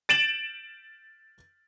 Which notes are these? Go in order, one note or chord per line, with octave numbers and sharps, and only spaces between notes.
A6 D7 E7 F#7